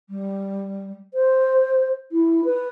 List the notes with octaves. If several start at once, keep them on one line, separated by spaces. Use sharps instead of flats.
G3
C5
E4
B4